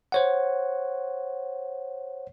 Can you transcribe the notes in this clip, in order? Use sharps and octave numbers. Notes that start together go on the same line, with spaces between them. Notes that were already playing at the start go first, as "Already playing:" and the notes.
C5 C#5 F#5